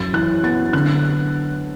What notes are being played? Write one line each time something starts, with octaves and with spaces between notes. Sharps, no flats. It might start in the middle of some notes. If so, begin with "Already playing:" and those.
Already playing: F#2 A6
E3 F#6
B3 A6
D3 F#6